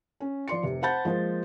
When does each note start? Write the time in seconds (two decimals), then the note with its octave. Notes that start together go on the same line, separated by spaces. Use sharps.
0.20 C#4
0.48 F3 D5 C6 C#7
0.63 F1 C3
0.82 C5 F#5 A5 B5 G6 A6
1.05 F3 G#3 A#3 C5